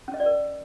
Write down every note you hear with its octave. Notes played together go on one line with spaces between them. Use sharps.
C#4
D#5
D5
A#4